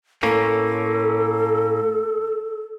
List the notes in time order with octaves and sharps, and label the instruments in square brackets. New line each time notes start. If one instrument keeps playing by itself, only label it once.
[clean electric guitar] A2 A#3 C#4 [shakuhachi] A4